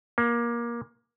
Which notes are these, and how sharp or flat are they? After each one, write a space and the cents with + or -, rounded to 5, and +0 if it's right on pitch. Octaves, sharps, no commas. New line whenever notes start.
A#3 +20